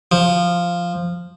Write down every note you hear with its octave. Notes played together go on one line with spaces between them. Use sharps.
F3